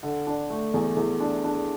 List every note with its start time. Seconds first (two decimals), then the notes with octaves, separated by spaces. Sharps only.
0.03 D3
0.27 D4
0.50 A3
0.74 E2
0.96 E2
1.20 D4
1.44 D4